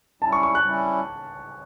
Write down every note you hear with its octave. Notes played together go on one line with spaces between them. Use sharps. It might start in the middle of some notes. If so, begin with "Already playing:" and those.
G3 C#4 E4 A5
C#6
C#6
F#6
G3 C#4 E4